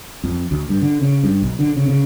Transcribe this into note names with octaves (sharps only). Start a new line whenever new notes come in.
F2
D2
G2
D3
C#3
G2
B1
D3
C#3
C#3